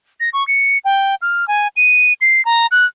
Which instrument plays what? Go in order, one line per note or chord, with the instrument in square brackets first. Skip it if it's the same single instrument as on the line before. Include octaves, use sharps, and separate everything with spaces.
[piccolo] A#6
C#6
C#7
G5
F6
G#5
D#7
C7
A#5
F#6